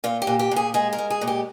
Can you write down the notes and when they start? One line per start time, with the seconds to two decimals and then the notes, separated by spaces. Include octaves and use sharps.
0.04 A#2 F4
0.22 G4
0.27 A#2
0.39 G4
0.51 A#2 G#4
0.74 G#3 G#4
0.93 A#4
0.98 G#3
1.10 G#4
1.21 A#2
1.27 G4